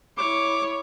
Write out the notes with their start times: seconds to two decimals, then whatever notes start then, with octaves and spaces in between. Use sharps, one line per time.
0.18 E4 C#5 D6